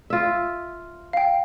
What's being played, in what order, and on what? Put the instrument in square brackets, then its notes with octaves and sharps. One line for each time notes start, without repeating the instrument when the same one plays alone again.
[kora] F4 E5
[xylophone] F5 G5